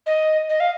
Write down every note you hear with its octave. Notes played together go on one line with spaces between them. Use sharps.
D#5
D#5
F5